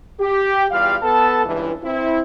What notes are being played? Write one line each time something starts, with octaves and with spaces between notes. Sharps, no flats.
G4
E2 G3 F4 F5
B3 A4 A5
C#2 G2 E3
C4 E4